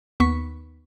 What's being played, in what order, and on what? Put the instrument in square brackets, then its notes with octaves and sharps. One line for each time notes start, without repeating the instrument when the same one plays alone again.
[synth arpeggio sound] D#2 B3 C#6 B6